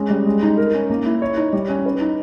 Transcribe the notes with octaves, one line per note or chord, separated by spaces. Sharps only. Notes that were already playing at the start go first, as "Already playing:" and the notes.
Already playing: G#3 C#4
G3
G#3
D#4
A#4
C#4
A#3
E4
C#5
D#4
G3
C#4
B4
D#4